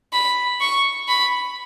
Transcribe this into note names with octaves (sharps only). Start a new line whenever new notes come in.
B5
C#6
B5